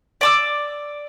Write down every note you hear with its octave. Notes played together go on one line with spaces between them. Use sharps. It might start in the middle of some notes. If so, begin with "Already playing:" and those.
D5 D6 E6